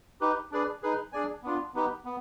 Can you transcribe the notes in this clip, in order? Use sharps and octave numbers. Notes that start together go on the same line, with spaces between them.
D#4 G4 B4
D4 G#4 B4 D5
D#4 G#4 B4
D4 G#4 D5 G#5
B3 D4 F4
B3 D#4 G4 B4
B3